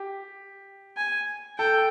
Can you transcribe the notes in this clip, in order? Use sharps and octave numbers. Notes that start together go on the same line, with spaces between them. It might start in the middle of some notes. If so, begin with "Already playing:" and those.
Already playing: G4
G#5
A4 G5